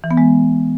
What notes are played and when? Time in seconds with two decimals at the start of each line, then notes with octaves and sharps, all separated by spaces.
0.04 E3
0.11 B3
0.17 G#3